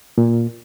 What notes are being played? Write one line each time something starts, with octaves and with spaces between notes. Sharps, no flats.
A#2